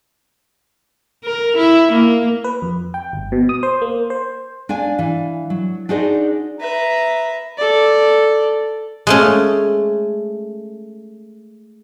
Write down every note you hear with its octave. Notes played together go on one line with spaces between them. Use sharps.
A#4
E4
A#3
B4
F2
G5
G1
B2
D#6
C5
A#3
C5
D4 D5 F5 G#5
E3 F5
F#3
D4 D#4 F#4 G#4 C5 D5
B4 E5 A#5
A4 D5
G#3 A3 C#4